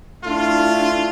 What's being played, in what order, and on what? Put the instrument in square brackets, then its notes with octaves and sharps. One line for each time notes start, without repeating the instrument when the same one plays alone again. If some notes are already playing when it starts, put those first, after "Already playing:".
[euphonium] A3 [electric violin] D4 E4 [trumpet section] F4